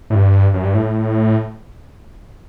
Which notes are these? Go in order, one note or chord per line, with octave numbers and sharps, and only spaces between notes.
A2
G2
F#2
G2
A2